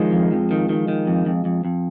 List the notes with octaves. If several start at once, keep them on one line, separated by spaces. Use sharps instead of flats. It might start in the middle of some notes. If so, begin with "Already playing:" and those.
Already playing: D#3 F3 G#3
F2
F2
D#3
D#3
D#3
F2
F2
F2
F2